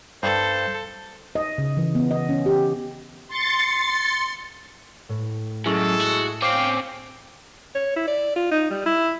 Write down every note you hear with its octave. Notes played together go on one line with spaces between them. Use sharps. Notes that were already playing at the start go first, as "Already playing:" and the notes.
G2 A4 C5
D#5
C#3
E3
B3
D#5
C#4
G4
C6 A6 C#7
A2
F#2 G#3 E4 G#4 A4 C#6
F#4
C4 C#4 F5 G5 D6 C7
C#5
E4
D5
F4
D#4
G3
E4